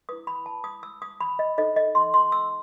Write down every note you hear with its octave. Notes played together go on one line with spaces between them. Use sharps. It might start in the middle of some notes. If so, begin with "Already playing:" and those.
E4 B4 D#6
B5
A5
D#6
E6
D#6
B5
D#5
D#4 A4 C5 D#5
D#5
C6
C6
E6